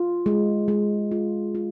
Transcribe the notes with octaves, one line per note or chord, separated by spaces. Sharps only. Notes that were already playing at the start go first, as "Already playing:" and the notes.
Already playing: F4
G#3
G#3
F4
F4